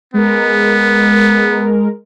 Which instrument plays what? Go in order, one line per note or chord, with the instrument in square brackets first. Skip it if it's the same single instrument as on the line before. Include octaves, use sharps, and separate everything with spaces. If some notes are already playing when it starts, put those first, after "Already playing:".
[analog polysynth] G#3 A#4 [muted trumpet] B3